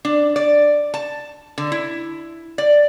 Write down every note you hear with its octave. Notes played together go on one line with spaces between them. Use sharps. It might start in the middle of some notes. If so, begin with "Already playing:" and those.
D4
D5
A5
D3
E4
D5